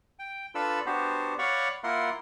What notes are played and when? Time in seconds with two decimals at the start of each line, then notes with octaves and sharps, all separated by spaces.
0.19 G5
0.55 D4 F4 A4 B4 B5 E6
0.86 B3 D4 F#4 G4 C5
1.39 C#5 D5 F5 F#5 B5 C#6
1.83 A#3 E4 F4 A#4 F#5 C6